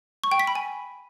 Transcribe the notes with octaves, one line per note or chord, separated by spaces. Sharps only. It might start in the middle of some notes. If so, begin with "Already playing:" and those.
C#6
G5
B6
B5
G#5